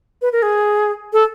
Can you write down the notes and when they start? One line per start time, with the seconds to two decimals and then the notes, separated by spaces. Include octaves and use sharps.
0.22 B4
0.32 A#4
0.42 G#4
1.13 A4